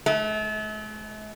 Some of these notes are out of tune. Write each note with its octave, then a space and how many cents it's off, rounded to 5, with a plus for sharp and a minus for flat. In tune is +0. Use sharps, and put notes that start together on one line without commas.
A3 -45